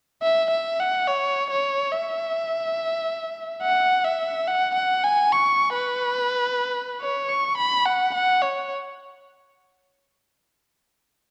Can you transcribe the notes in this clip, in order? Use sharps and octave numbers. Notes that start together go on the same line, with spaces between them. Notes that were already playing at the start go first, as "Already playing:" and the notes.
E5
E5
F#5
C#5
C#5
E5
F#5
E5
F#5
F#5
G#5
C#6
B4
C#5
C#6
B5
F#5
F#5
C#5